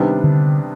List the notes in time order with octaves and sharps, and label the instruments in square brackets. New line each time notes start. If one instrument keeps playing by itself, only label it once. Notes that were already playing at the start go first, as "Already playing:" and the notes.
Already playing: [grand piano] C3 D#3 G3 B3 D4
[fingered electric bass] D3